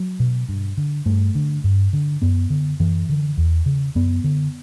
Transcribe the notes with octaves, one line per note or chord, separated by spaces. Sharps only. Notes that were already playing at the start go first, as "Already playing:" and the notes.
Already playing: F#3
B2
G2
D3
G2 A3
D3
G2
D3
F#2 B3
D3
F#2 E3
D3
E2
C#3
F#2 B3
D3